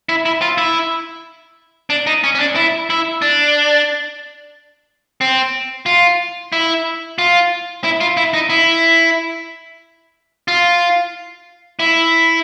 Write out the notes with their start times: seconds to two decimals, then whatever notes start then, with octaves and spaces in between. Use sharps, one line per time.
0.09 E4
0.26 E4
0.42 F4
0.58 E4
1.90 D4
2.07 D#4
2.24 C#4
2.35 C#4
2.40 D4
2.56 E4
2.90 E4
3.22 D4
5.21 C4
5.86 F4
6.52 E4
7.18 F4
7.84 E4
8.01 F4
8.17 E4
8.34 D#4
8.50 E4
10.48 F4
11.79 E4